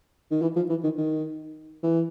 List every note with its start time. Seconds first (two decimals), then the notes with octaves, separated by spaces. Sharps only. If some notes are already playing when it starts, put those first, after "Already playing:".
0.31 D#3
0.42 E3
0.56 F3
0.69 E3
0.83 D#3
0.98 D#3
1.83 E3